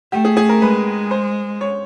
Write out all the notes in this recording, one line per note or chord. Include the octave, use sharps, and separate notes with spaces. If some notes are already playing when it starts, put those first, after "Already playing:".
A3 G4
G#4
G#4
A#4
G#3 B4
C5
C#5